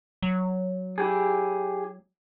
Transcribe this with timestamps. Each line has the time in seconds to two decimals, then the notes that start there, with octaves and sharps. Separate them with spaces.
0.22 F#3
0.98 E4 G4 G#4